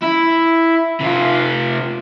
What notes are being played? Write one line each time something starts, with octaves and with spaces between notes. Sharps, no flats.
E4
C3 F4